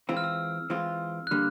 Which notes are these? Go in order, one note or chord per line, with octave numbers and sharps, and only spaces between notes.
E3 G#3 C4 F4 E6
F6
E6
E3 G#3 C4 F4
F#6
D3 G3 A#3 F6